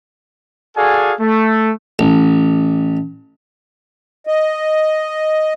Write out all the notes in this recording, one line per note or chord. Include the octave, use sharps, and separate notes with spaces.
F#4 G#4 A4 D5 F5 G#5
A3
A1
D#5